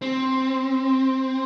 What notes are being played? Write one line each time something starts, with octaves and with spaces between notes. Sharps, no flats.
C4